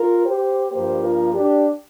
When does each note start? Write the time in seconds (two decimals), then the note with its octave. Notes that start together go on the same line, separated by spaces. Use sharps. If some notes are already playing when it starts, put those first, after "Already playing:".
Already playing: F4 A#4
0.25 G4 C5
0.72 G2 F3 A#3 G4 C5
1.02 F4 A#4
1.33 D4 G4